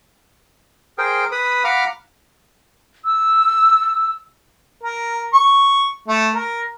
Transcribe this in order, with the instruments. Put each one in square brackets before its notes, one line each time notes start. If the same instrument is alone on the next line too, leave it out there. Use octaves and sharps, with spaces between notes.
[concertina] G#4 A#4 C5 G5
B4 B5 D#6
F5 F#5 A#5 B5 D6 F6
[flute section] E6
[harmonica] A#4
C#6
A3
A#4